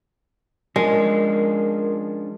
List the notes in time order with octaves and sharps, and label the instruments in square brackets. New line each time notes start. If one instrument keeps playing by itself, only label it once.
[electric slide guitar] F3 C#4 D4 [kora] G#3 [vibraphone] A#4